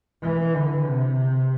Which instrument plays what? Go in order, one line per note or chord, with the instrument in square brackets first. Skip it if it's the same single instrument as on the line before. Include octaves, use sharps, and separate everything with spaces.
[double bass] E3
D3
C3